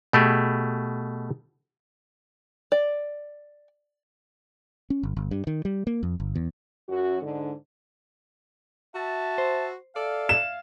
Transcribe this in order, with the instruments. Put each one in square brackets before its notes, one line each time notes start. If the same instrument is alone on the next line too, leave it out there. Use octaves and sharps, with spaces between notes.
[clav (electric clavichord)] B2 A3 G4 G#4
[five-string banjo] D5
[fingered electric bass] C#4
G1
G1
G2
D#3
G3
A#3
F2
G1
E2
[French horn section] F#2 F#4
G#2 D3
[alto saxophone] F#4 [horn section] E5 A5
[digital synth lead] C5
[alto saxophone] A4 [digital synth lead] D5 [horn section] E5 F5
[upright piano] E7